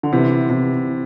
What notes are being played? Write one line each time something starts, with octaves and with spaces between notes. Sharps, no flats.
D3
C3 E3
C3 E3